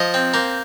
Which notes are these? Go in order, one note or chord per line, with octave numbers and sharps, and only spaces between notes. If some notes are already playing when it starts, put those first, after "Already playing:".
Already playing: F3 D#5
C4
A#3 C5